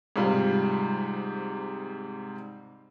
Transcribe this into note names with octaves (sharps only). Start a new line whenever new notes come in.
G#2 C3 G3 F4